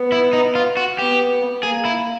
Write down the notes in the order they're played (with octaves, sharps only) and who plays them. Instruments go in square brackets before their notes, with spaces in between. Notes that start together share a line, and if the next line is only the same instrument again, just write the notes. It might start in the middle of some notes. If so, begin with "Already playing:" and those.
Already playing: [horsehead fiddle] B3
[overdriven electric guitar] E4
D#4
F4
F#4
[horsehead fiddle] B3 [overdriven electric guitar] G4
[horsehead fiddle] A#3 [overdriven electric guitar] G#4
[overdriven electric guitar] E4